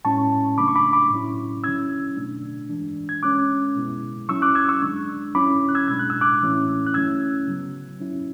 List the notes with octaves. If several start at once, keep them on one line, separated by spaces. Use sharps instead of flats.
A2 G#3 C#4 E4 A5 C#6
C#3 F#3 A3 D4 B5 D6
C#6
B5 D6
B5 D6
A2 F#3 C#4 E4
D3 F#3 C#4 E4 E6 G#6
B2 A3 D4
E3 G#3 D4
G#6
D3 G#3 C#4 D6 F#6
B2 G#3 B3 E4
F#3 C#4 E4 C#6 E6
D6 F#6
E6 G#6
C#6 E6
D3 G#3 D4
F#3 C#4 E4 B5 D6
F#6
E6 G#6
B2 G#3 D4 G#6
F#6
E6
D6 F#6
A2 E3 A3 C#4 E4
F#6
D3 F#3 A3 C#4 E4 E6 G#6
C#3 F#3 B3
F#3 C#4 E4